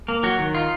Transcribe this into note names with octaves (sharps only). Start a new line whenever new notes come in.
A#3
F#3 F#4
D#3
D#4 F4